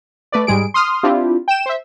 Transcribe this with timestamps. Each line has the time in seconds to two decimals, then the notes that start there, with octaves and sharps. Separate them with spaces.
0.32 A3 B4 D5
0.47 G#2 G3 G#3 G#4 D7
0.74 C6 D#6 F6
1.03 C4 D4 E4 F4 G4
1.48 G5 E7
1.66 C5 E5